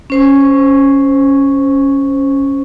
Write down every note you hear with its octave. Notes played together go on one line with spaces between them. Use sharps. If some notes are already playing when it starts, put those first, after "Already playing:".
C#4 C5 C#6